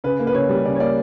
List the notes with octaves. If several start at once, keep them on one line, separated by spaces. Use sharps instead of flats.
C#3 B4
A#3
B4
C#3 C#5
G3
C#3 D5
C#5
A#3 D5